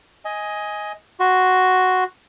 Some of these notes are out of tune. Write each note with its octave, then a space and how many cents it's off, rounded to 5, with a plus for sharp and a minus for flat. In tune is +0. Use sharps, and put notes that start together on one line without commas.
D#5 +15 G#5 +0
F#4 +0 C6 +0